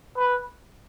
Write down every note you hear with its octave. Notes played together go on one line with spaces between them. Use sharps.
B4